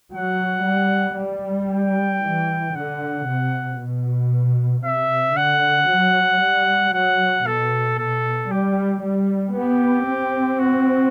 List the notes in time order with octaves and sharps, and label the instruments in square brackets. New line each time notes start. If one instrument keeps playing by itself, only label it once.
[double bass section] F#3 [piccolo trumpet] F#5
[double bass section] G3
G3
[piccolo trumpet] G5
[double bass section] E3
[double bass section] D3 [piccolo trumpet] F#5
[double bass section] C3
B2
[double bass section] C3 [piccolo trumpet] E5
[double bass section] D3 [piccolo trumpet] F#5
[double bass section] F#3
G3
[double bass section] F#3 [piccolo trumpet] F#5
[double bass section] B2 [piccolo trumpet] A4
[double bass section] B2 [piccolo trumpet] A4
[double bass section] G3 [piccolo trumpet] G4
[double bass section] G3
[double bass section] B3 [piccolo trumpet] G4
[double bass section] C4
[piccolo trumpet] F#4